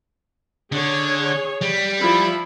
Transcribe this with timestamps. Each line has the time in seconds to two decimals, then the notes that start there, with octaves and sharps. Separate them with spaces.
0.72 D3 G#4 C#5
1.62 G3
1.99 F3 E4 B5